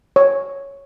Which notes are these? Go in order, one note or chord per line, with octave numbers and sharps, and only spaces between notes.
C#5